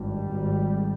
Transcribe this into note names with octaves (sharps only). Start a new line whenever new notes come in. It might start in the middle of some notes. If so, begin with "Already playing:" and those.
Already playing: G#1 G2 G3
G#1 G#2